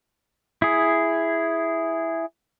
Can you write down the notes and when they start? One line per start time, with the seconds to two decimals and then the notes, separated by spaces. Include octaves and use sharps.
0.62 E4 G#4